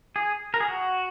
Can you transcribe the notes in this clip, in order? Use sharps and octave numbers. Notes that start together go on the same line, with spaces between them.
G#4
A#4
G#4
F#4